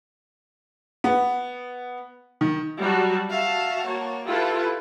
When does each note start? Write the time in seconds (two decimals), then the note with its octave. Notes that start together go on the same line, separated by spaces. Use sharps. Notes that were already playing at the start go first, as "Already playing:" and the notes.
1.04 B3
2.41 D#3
2.78 F#3 G3 F#4 A5
3.30 F#4 E5 F5 A5
3.86 A#3 C#5
4.26 E4 F4 G4 A4 B4